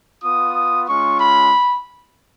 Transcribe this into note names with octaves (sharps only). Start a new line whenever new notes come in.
B3 F4 D#6
G#3 C#4 F4 C#6
B5